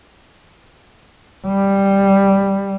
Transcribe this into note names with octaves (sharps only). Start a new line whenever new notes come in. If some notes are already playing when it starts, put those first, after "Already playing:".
G3